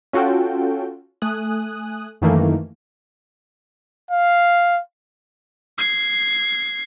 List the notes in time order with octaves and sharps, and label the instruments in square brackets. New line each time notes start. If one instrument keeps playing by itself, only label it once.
[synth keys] C#4 F4 F#4 A4 G5
A3 G#5 D#6 F#6
F#2 D#3 E3 A3 A#3
[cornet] F5
[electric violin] G#6 C7